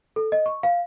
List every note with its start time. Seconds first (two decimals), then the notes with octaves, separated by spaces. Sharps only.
0.16 A4
0.32 D#5
0.46 C#6
0.63 F5